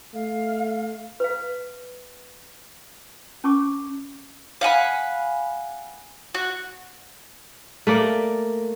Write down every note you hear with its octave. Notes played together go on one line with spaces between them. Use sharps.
A3 F5
B4 F5
C#4 A5 C#6 D6
F5 F#5 G#5 B5
F#4
A3 A#3 D5